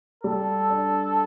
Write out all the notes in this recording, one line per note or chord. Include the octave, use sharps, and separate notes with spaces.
G3 A4
D4